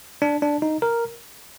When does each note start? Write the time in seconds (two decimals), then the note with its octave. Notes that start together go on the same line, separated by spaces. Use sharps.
0.22 D4
0.42 D4
0.62 D#4
0.82 A#4